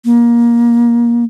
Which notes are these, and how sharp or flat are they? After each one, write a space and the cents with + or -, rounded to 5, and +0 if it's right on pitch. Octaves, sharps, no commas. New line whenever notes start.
A#3 +20